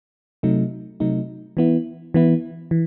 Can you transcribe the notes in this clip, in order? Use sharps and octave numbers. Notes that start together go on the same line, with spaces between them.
C3 F#3 A3 D#4
C3 F#3 A3 D#4
E3 B3 E4
E3 B3 E4
E3